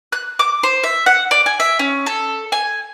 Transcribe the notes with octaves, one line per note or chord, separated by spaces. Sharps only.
F#6
D6
C5
E5
F#5
D5
G#5
E5
C#4
A4
G#5